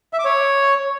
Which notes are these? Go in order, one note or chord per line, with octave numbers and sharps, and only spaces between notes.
E5
D6
C#5